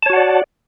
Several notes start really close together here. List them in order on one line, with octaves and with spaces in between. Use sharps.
A5 C#5 F#4 F#5 D5